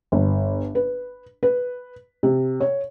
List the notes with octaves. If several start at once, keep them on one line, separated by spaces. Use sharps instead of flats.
G1
B4
B4
C3
C#5